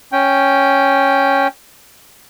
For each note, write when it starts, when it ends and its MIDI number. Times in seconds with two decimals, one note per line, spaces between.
0.12 1.48 61
0.12 1.48 79